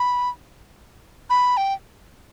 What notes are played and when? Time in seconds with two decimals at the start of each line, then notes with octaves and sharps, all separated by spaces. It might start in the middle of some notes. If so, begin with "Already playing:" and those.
Already playing: B5
1.30 B5
1.57 G5